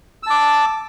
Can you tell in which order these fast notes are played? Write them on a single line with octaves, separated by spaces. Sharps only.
E6 A5 D6